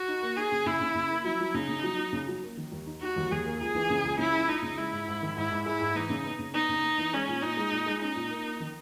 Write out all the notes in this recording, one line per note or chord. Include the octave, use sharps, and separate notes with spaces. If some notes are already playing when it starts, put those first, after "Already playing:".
Already playing: F#4
D#4
A#3
D#4 G#4
C#3
C#3 E4
C#3
C#3
A#3
F#3 E4
F#3
C#3 D#4
C#3
F#3
F#3
C#3
F#3
A#3
D#3
D#2
D#4
D#4 F#4
D#2
D#2 G#4
A#3
C#2 G#4
E3
C#3
C#2
C#3 E4
C#2
C#2 D#4
C#3
G#3 E4
G#2
G#2
D#3
G#2 E4
G#2
G#3 E4
G#2
E3 D#4
C#3
B3
C#3
B3 D#4
C#3
B3
E3
G#3 C#4
A#2
A#2 D#4
G#3
A#2
G#3
C#4 D#4
A#2
A#3
A#3
D#3